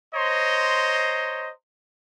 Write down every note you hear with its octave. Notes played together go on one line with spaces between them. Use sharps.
C5 C#5 D#5 A#5 C6